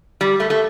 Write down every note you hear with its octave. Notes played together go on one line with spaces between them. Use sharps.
G3
A3
A3